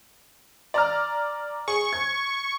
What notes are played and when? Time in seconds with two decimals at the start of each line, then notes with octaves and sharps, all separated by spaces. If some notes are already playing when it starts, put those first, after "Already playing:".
0.74 D5 A#5 F6
1.68 G#4 C#6
1.93 G#6